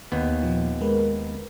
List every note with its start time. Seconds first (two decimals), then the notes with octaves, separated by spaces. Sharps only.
0.12 D#2 B3
0.43 A#2 F3
0.81 G#3 A#4 B4